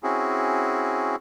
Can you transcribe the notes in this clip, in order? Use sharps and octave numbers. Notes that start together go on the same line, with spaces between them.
C4 C#4 E4 F#4 G#4